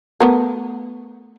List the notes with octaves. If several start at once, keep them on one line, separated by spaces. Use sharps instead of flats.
A3 B3 A#4